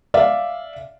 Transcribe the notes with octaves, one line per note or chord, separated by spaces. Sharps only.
D5 E5 F5